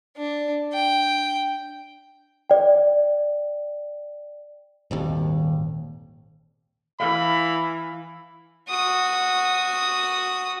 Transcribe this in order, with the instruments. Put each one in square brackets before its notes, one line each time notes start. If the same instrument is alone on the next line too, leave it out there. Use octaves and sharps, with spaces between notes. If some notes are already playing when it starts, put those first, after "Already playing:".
[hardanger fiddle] D4
G5
[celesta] D5 G5
[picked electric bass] D#1 G#1 D#2
[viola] E3 [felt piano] F5 [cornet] B5
[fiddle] F#4 D#6